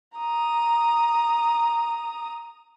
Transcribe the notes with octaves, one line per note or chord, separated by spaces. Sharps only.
A#5 D#6